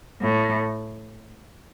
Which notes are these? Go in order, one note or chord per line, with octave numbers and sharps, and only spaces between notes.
A2